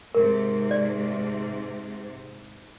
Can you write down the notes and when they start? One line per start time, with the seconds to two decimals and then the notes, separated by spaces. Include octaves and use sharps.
0.15 G#2 C3 A#4
0.71 D5